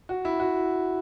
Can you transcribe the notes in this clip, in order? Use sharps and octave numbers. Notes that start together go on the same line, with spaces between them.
F#4
E4
F#4